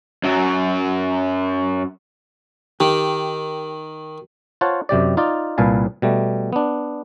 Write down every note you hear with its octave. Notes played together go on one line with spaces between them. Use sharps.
F#2 F#3
D#3 G4
F4 C5 C#5 F#5 A5
F#2 C3 G4 D5
D#4 F4 D5
C2 A#2 B4 F5 G#5 A5
B2 G3 A3
B3 D4